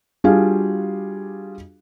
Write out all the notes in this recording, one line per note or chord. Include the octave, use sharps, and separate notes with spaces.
G3 D4 F4 F#4 G#4 F5